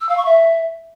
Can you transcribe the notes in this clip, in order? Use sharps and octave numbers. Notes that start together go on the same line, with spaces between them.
E6
F5
C#6
E5